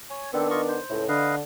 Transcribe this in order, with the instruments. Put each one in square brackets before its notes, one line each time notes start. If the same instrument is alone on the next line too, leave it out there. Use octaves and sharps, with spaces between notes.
[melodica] C#5 G#5
[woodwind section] D#3 B3 D4 [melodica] C4 A4
[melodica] F4 D#5 C#6
C5
[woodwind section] C#2 A2
[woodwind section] D3 [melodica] B4 D#5 F5